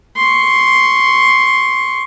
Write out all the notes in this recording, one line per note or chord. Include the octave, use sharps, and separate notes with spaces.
C6 C#6